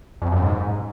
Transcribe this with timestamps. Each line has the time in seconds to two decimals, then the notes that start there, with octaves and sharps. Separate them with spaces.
0.22 F2
0.32 F#2
0.42 G#2